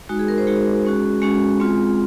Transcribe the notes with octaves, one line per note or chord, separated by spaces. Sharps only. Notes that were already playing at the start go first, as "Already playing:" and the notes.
G#3 D#4 F#4
G#4
A#4
C5
G#3 D#4 F#4 G#4
G#3 C#4 F#4
G#3 C#4 F#4
G#3 C4 F4